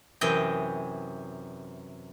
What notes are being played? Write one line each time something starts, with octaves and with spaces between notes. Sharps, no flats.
F#2 C3 E3 D#5 G5